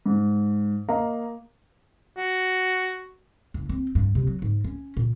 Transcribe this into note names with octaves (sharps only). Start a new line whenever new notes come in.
G#2
A#3 D#5 F5 A#5
F#4
F#1
C4
G2
C3
F#3
G#2
C#4
A#2